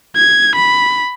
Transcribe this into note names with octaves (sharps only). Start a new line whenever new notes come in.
G#6
B5